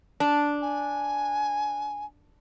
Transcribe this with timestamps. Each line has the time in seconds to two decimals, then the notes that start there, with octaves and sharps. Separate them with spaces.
0.20 D4
0.62 G#5